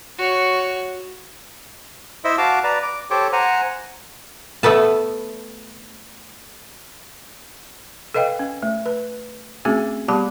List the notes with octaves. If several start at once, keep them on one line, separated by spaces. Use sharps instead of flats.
F#4 C#5
E4 C5 D#5 E5
F#4 F5 A5 D6
B4 D5 A#5
D6
G4 A4 C5 C#5 D6
C5 F#5 G#5 A#5
A3 B3 B4 A5
A4 B4 D#5 F5 G5
C#4
A3
B4
A3 C4 C#4 F#4 G#4
G3 B3 G4 A5 B5